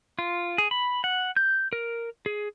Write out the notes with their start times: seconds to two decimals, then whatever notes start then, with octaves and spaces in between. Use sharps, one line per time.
0.19 F4
0.58 G#4
0.71 B5
1.04 F#5
1.37 G6
1.73 A#4
2.26 G#4